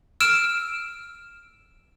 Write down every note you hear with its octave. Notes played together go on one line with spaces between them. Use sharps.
E6 F6 D7 E7